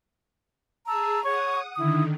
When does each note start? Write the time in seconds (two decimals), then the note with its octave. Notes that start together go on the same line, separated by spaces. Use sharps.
0.88 G#4 A5 A#5 E6
1.23 C#5 F#5 C#6 D#6
1.76 D3 D#3 E4 D#6